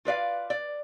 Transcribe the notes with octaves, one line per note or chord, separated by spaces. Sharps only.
F4 B4 D5 F5
D5